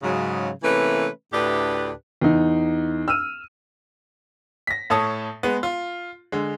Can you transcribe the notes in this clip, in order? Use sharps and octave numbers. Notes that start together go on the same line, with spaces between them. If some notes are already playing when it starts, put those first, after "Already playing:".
G#2 C#3 F#3
C3 E3 A3 A#3 C#4 B4
D2 A2 D4 G4 B4
E2 D#4
E6 F6 D#7
A#6 B6
A2 A4 C#5 A5 D#6
G#3 B3
F4
D3 G#3